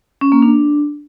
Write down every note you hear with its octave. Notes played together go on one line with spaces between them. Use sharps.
C#4
A#3
D4